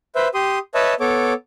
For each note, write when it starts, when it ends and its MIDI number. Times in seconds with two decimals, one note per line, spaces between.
0.15 0.28 71
0.15 0.28 72
0.15 0.28 76
0.34 0.59 67
0.34 0.59 84
0.34 0.59 87
0.75 0.94 71
0.75 0.94 73
0.75 0.94 75
0.75 0.94 76
0.75 0.94 81
1.00 1.33 59
1.00 1.33 69
1.00 1.33 73
1.00 1.33 86